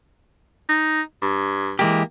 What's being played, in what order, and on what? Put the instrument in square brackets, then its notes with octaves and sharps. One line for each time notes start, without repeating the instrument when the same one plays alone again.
[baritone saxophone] D#4
G2
[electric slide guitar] E3 G#3 G4 [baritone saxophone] A#3